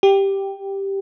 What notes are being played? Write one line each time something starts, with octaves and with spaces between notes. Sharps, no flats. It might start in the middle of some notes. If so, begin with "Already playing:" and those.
G4